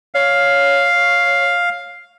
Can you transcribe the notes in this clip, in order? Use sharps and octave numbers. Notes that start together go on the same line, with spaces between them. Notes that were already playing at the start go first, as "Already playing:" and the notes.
C#5 F5